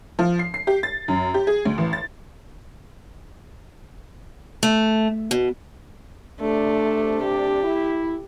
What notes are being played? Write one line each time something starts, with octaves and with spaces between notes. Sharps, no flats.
F3
C7
C7
G4
A6
F#2
G4
G#4
D2
A1
A6
A3
B2
C3 A3 D4
G4
E4